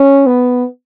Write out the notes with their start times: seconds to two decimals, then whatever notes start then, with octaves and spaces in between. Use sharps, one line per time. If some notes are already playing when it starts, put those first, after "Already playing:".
Already playing: C#4
0.27 B3